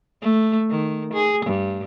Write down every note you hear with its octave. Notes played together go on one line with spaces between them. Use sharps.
A3
D#3
G#4
G2